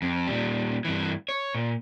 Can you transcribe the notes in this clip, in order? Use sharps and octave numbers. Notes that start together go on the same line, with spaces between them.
F2
A#2 G3
G2 E3
C#5
A#2